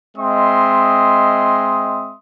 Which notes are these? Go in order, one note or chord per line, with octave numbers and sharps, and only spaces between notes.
G#3 C4 D#5 E5 C6 D#6